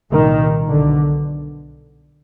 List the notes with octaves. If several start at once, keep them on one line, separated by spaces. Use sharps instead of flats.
C2 A#2 D#3
B1 B2 D3